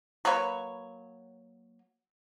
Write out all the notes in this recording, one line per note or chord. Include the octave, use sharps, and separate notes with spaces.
F#3 A#3 B4 C#5